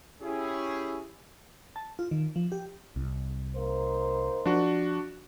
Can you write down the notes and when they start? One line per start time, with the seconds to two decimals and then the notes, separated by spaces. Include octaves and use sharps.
0.22 C#4 E4 G4 G#4
1.76 A5
1.99 F4
2.11 D#3
2.36 F3
2.52 G4
2.96 C2
3.55 A#3 D#4 C5
4.46 F3 D4 F#4